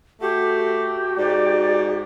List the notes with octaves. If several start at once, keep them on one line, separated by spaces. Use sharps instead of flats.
A3 F#4 G4
G#2 D5